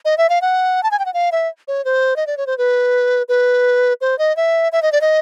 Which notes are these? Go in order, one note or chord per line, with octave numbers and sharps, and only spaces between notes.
D#5
E5
F5
F#5
A5
G#5
G5
F#5
F5
E5
C#5
C5
D#5
D5
C#5
C5
B4
B4
C5
D#5
E5
E5
D#5
D5
D#5